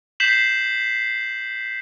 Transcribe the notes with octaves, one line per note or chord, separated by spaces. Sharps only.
G6 B6 C7 E7 F#7